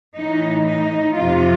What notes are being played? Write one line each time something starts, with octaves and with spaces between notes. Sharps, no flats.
A2 E3 D#4
D#4
F2 C3 F3 F4